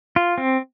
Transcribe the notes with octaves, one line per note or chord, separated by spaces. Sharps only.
F4
C4